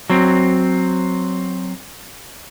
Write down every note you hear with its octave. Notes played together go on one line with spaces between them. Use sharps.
F#3 C4